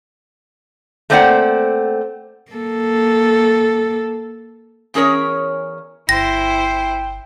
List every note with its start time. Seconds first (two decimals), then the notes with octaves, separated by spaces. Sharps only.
1.10 A3 A#3 C4 C5 D5 F#5
2.51 A#3 A4
4.94 E2 C#4 G#4 A#4 C#5
6.09 G1 E4 C5 G5 A#6